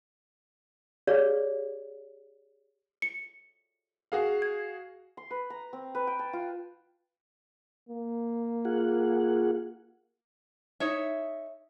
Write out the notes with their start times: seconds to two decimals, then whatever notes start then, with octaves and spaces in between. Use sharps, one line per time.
1.07 G4 G#4 C#5 D5 F5
3.02 C#7
4.12 F#4 G#4 F5
4.42 G#6
5.17 C6
5.31 B4
5.50 A#5
5.73 C4
5.95 B4
6.07 G5
6.19 A5
6.33 F4
7.89 A#3
8.65 F4 G#4 F#5
10.80 D#4 C#5 E5